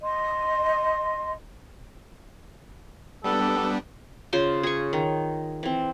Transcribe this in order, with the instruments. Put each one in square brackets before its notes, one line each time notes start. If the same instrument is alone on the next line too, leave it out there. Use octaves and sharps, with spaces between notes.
[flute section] D#5 C6
[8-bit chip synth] G3 B3 D4 [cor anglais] A4
[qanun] C#3 F4 C5 C6
G#4 C#6
D#3
E3 C4